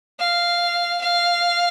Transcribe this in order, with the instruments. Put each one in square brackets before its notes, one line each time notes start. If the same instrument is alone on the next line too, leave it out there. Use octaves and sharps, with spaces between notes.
[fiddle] F5
F5